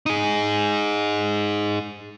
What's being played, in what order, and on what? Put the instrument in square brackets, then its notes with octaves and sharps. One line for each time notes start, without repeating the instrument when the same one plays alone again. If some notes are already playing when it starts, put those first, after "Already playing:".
[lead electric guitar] D#4 G#4